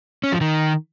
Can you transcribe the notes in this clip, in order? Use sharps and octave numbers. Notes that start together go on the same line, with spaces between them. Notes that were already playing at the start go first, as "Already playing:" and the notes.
C#4
F3
D#3